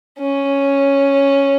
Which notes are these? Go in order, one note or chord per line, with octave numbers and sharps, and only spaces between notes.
C#4